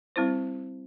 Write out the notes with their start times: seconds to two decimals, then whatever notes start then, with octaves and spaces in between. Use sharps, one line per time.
0.16 G3 C4 E4 C5